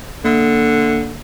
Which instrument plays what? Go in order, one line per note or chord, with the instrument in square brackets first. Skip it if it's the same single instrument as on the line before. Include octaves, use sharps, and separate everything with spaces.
[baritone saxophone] D3 [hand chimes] A#3